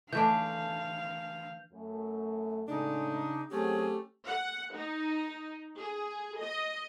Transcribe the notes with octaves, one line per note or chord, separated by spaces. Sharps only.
E3 A3 D4 F5 G6
F#2 A3
A2 C#3 G#3 D4 D#4
F#3 A3 C4 C#4 G4 G#4
F#5
D#4
G#4
D#5